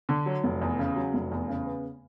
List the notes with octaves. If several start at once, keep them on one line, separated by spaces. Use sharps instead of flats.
D3
F#3
F1
E2
C#3
F#3
F1
E2
C#3
B3